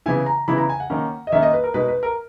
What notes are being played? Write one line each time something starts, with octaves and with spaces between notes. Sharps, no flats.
C#3 E3 B3 E4 G#5
A#5
C#3 E3 B3 E4 B5
A#5
G#5
F#5
D#3 A#3 C#4
D#5
D#3 A#3 C#4 E5
D#5
B4
A#4
B2 G#3 D#4 B4
B4
A#4